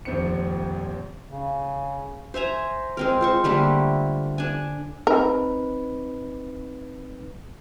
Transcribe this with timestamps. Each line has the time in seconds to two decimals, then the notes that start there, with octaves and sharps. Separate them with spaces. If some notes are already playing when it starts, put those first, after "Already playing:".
0.05 D#1 G#1 F2 C4 C5 C#7
1.28 C#3
2.34 C5 E5 G#5 A#5
2.97 G#3 C4 A#4
3.21 F4 C5 C#6
3.44 D3 G3 A3 A#3
4.38 D4 G#5
5.07 C4 D#4 A#4 B4